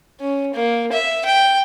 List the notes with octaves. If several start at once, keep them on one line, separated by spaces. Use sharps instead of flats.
C#4
A#3
E5
G5